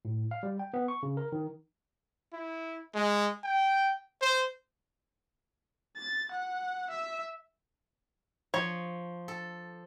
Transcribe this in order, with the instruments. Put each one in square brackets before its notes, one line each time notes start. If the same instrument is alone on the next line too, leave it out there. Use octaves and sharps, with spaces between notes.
[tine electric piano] A2
F5
G3
G5
B3
C#6
C#3
A#4
D#3
[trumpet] E4
G#3
G5
C5
[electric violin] A6
F#5
E5
[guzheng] F3 [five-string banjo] C#5
[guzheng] A4